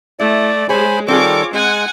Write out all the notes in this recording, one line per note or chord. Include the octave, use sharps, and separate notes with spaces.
A3 E4 D5
G#3 G#4 C5 C#5 G#5 B5
D#3 G3 C4 F4 G#4 A4 C#5 D6
G#3 C4 F#5 G#5